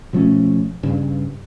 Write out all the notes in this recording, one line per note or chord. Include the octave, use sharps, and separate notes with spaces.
B2 F3 A3 C#4
G2 C#3